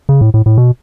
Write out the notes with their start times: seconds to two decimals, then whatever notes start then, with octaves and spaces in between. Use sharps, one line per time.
0.09 C#3
0.21 A2
0.34 A2
0.46 A2
0.58 B2